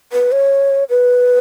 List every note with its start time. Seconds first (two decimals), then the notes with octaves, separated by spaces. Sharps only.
0.13 B4
0.32 C#5
0.90 B4